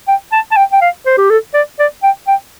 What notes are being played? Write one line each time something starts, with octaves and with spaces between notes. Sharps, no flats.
G5
A5
A5
G5
G5
F5
C5
G4
A4
D5
D5
G5
G5